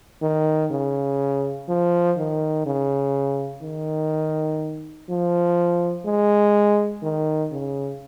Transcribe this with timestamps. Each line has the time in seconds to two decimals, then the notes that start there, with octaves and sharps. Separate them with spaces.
0.22 D#3
0.71 C#3
1.68 F3
2.17 D#3
2.66 C#3
3.62 D#3
5.09 F3
6.06 G#3
7.02 D#3
7.52 C#3